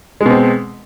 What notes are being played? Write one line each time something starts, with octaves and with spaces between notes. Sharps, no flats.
B2 G#3 C4